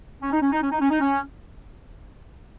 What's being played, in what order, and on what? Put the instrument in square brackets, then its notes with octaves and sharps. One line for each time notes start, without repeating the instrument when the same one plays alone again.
[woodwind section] C#4
D#4
C#4
D#4
C#4
D#4
C#4
D#4
C#4